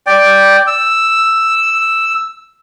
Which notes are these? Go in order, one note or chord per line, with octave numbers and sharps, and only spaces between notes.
D5 G5
E6